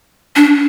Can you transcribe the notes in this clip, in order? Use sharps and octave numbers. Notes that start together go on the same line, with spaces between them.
D4